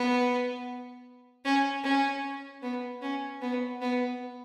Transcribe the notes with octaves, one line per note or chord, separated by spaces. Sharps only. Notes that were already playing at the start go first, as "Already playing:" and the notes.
Already playing: B3
C#4
C#4
B3
C#4
B3
B3